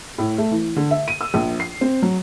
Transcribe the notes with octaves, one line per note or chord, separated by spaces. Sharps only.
A2
A3
E3
D3
E5
D#7
E6
A#1
C7
C4
F#3